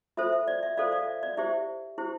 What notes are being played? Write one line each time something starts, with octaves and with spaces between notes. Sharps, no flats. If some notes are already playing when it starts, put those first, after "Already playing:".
F4 A4 C5 E5
E5
D5
E5
F4 A4 C5 D5 F5
D5 F5
E5
D5
E4 G4 C5 E5
E4 G4 C5